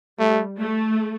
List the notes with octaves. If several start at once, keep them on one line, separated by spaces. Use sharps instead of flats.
G3 A3
A3